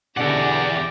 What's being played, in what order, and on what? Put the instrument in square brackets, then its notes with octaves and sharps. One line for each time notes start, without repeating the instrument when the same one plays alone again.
[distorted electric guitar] E2 F#5 [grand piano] B2 D3 [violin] G4 A#6 [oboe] D5